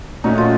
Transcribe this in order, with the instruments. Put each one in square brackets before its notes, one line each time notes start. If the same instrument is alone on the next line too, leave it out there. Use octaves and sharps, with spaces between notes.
[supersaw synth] A#2 A3 C#4 F#4 [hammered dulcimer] D#4
[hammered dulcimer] F4